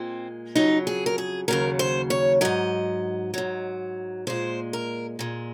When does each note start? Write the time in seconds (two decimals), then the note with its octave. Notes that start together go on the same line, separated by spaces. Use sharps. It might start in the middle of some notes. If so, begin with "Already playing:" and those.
Already playing: A#2 G#3 C4
0.55 F2 C#3 F#3 D#4
0.87 G#4
1.06 A#4
1.18 G#4
1.48 D#2 C#3 F#3 A#4
1.79 C5
2.10 C#5
2.41 G#2 F#3 D#5
3.34 G#2 F#3
4.27 A#2 G#3 C5
4.73 A#4
5.19 A#2 G#3